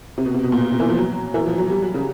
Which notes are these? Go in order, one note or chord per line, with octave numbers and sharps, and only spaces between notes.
C3
B2
C3
B2
A#2
B2
C3
E3
F3
F#3
E3
F3
F#3
G3
F#3
C#3